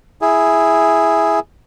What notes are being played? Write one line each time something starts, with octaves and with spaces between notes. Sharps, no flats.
E4 G#4